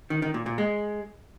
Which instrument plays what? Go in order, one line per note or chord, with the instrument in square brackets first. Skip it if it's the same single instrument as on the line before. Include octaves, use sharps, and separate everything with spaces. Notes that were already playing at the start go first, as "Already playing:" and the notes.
[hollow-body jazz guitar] D#3
D#3
A#2
A#2
G#3